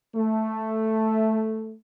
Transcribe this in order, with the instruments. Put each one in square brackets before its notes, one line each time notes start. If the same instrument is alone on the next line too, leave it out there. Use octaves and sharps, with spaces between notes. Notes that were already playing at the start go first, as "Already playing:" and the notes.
[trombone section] A3